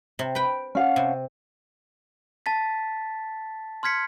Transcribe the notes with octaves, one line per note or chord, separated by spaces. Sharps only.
C3
B4 G5
C#4 F5 F#5
C3
A5 A6 B6
C6 F6 G#6 B6 C#7